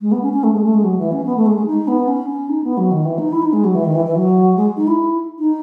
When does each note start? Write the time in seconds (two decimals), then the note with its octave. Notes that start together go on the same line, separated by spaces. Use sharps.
0.01 G#3
0.12 B3
0.22 C#4
0.33 C#4
0.43 A3
0.53 G#3
0.64 A3
0.74 G#3
0.84 F#3
0.98 E3
1.12 C#4
1.26 B3
1.36 A3
1.46 G#3
1.57 G#3
1.66 D#4
1.88 B3
2.08 C#4
2.30 C#4
2.49 D#4
2.64 B3
2.77 F#3
2.91 D#3
3.05 E3
3.18 D#4
3.32 E4
3.42 D#4
3.53 G#3
3.64 F#3
3.74 E3
3.85 D#3
3.95 E3
4.05 E3
4.15 F#3
4.56 G#3
4.77 D#4
4.87 E4
5.39 D#4